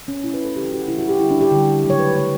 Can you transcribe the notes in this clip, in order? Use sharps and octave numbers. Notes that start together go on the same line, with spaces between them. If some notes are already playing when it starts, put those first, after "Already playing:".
C#4
B2 A3 E4
B4
A4
C#3 E3 G3 G4
F#4
C#3 E3 G3 E4
F#4
G4
D3 G3 E4
D4
G4
D3 G3
C#3 F#3 A3
C#5
B4
C#3 F#3 A3 C#5